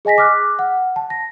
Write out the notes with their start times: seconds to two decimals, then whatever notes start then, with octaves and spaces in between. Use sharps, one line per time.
0.05 G#4 D#5 G#5 A#6 B6
0.18 D6 F6 F#6
0.59 F#5
0.96 A5
1.10 A#6